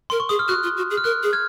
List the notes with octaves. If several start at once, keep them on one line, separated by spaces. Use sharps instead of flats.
A#4 C6
C#6
G#4 D#6
F6
F#4 F#6
F4
F#4
G#4
F6
A#4 F#6
G#4
F6 G#6